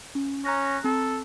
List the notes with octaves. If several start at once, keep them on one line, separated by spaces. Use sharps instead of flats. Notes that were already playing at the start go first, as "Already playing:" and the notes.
C#4
C#4 A#5 F#6 A#6
C4 A4